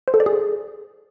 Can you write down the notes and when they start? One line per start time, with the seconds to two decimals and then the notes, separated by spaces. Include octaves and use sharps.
0.08 C5
0.14 A4
0.20 D5
0.26 G#4